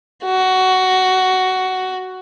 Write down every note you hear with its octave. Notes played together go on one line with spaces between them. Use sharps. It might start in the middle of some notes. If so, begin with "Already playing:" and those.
F#4